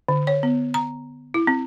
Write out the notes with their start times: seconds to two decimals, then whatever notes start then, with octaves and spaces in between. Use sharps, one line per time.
0.08 D3
0.27 C#5
0.43 B3
0.74 A#5
1.34 E4
1.47 C4